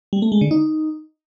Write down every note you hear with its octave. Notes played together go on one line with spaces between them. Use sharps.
G3
A3
G#3
D3
D#4